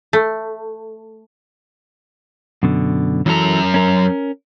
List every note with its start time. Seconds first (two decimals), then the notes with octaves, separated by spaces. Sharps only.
0.13 A3
2.63 F#2 B2 D3
3.26 F#2 E3 F#3 A4 A#5
3.74 C#4 A#4